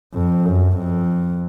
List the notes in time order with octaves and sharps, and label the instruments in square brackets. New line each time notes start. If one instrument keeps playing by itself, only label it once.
[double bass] F2
F#2
F2